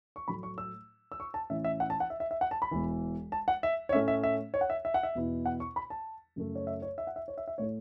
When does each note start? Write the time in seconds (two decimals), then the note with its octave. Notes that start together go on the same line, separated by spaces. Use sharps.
0.16 C#6
0.28 A2 F#3 A3 B5
0.43 C#6
0.58 E6
1.12 E6
1.20 C#6
1.34 A5
1.50 A2 E3 C#4 E4 E5
1.64 E5
1.80 F#5
1.90 A5
2.00 F#5
2.10 E5
2.20 E5
2.31 E5
2.41 F#5
2.51 A5
2.62 B5
2.71 E1 E2 E3
3.32 A5
3.48 F#5
3.63 E5
3.89 C#5
3.93 A2 A3 C#4 E5
4.08 E5
4.23 E5
4.54 C#5
4.61 F#5
4.70 E5
4.85 E5
4.94 F#5
5.03 E5
5.15 E2 B2 B3 E4
5.46 F#5
5.60 C#6
5.76 B5
5.90 A5
6.36 F#2 C#3 F#3 A3
6.55 C#5
6.67 E5
6.82 C#5
6.98 E5
7.07 F#5
7.16 E5
7.28 C#5
7.38 E5
7.48 E5
7.58 A2 A3 E4 C#5